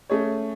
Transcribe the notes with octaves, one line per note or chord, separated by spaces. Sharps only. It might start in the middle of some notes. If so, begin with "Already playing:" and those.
A3 C#4 G#4 C#5